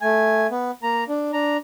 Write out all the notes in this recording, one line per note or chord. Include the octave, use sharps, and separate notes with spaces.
A3 G#5
B3
A#3 A#5
D4
D4 A#5